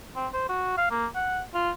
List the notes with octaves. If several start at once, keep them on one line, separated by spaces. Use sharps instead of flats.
C4
C5
F#4
F5
A#3
F#5
F4